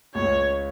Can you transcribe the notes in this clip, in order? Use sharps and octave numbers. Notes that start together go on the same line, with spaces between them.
C#2 C#5